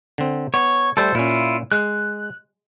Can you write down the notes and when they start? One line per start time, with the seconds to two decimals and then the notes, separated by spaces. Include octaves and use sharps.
0.18 D3 C4
0.54 B3 C#5
0.97 G3 A3 A4 C5
1.15 A#2 C#4 E4 F4
1.72 G#3 F#6